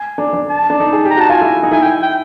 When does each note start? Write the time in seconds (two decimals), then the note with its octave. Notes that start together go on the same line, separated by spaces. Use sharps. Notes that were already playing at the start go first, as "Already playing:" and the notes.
Already playing: G#5
0.18 D4
0.33 D4
0.50 A5
0.70 D4
0.80 D#4
0.93 G#4
1.05 G4
1.10 A#5
1.17 F#4 A5
1.29 F4 G#5
1.41 E4
1.63 D#4
1.72 E4 G#5
1.82 G5
2.03 G5